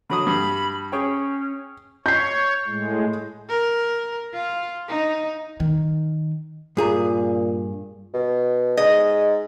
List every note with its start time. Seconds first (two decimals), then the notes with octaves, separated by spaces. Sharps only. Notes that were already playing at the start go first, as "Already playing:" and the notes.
0.10 D3 F#3 B5 D#6
0.27 G2
0.92 C#4 G#4 C#5 G5
2.06 C#5 G6 C7
2.67 A2 G#3
3.50 A#4
4.34 F4
4.89 D#4
5.60 D#3
6.77 G2 A#2 G#4 A#5
8.13 B2
8.77 G#2 D#5